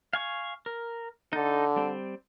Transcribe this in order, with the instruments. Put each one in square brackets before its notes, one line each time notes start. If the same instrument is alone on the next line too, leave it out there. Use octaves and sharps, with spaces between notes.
[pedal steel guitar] F5 G#5 C#6
A#4
[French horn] D3 [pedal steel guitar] D#4 A4
[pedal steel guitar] G3 C4